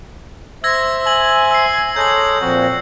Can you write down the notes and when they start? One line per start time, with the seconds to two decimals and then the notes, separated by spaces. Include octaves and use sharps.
0.64 C5 E5 E6 G#6 A#6
1.07 G#5 F#7
1.51 E6 C7
1.96 G#3 A4 C#5 A#5 G6 F#7
2.40 A#2 F3 C4 F#4